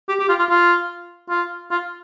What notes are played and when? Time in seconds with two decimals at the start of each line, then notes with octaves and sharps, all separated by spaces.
0.09 G4
0.19 G4
0.29 F4
0.39 F4
0.49 F4
1.30 F4
1.71 F4